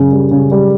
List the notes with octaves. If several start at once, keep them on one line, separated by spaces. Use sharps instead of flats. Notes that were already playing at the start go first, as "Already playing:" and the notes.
Already playing: F#2 C#3
G3
C#3
G3